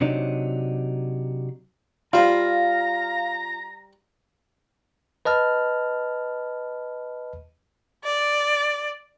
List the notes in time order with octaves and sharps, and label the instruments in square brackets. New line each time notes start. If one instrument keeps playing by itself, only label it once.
[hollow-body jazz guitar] C3 F#3 D4 D#4
[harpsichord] G3 C5 [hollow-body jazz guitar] F4 [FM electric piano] F5 [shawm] A#5
[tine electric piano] B4 D#5 A5 F6
[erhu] D5